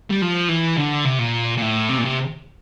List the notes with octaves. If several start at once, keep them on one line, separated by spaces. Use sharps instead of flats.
G3
F3
E3
D3
C3
A#2
A#2
A2
C3
A#2
C3